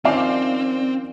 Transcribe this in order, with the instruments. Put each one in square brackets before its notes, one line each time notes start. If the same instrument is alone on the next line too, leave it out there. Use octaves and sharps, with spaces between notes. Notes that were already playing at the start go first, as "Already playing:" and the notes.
[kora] D#3 F3 C#4 [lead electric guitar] C4 [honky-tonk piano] D5 F5 D6